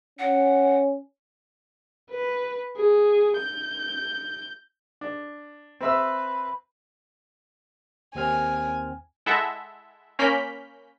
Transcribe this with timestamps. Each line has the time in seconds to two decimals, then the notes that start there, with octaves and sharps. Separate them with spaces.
0.19 C#4 F#5
2.11 B4
2.77 G#4
3.38 G6
5.01 D4
5.81 C4 B4 E5 E6
8.15 D#2 C4 G#5 F6
9.26 G#3 E4 A4 E5 F#5
10.19 A#3 C#4 B5 F6 G6 B6